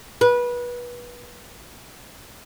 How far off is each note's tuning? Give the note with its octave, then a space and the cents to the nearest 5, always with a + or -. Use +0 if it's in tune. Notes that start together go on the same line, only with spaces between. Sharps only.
B4 -25